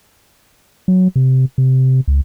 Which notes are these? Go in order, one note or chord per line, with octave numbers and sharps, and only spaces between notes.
F#3
C3
C3
C#2